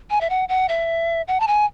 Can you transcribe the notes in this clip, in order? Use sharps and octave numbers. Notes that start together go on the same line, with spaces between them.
G#5
E5
F#5
F#5
E5
F#5
A5
G#5